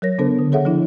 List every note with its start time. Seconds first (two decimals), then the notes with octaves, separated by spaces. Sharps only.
0.02 F#3 A#4 C#5 A#6
0.18 C#3 B3 D4 A4 C5
0.39 D3
0.52 G#4 A4 C#5 E5 F#5
0.65 F3 D4 E4